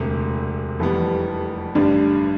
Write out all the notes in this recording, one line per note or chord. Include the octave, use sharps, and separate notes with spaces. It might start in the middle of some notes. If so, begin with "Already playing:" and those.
Already playing: E1 D2 C3
F1 F2 E3 G3 B3
A1 G2 D3 G3 D4